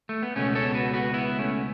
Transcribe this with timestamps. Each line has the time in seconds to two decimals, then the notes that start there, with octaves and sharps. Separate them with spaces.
0.09 A3
0.22 B3
0.36 C#2 B2 A3 C#4
0.55 A4 C#5
0.74 F#4 B4
0.94 F#4 B4
1.14 B3 E4
1.39 A3 C#4